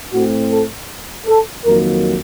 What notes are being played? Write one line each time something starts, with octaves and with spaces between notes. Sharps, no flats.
A2 A3 C4 F#4
A4
A4
F2 D#3 F#3 A#3 A#4